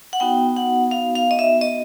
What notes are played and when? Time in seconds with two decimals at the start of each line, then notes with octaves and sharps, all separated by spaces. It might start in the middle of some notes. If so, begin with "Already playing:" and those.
0.13 F#5
0.20 B3 D#4 F#4 G5
0.57 F#5
0.91 F5
1.15 F5
1.31 D#5
1.39 E5
1.61 D#5